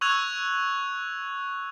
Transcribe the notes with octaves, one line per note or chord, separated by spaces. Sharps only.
C#6 E6 F#6 G#6 F7